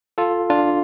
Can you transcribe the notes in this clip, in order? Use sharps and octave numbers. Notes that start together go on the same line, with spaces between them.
F4 A4
D4 F4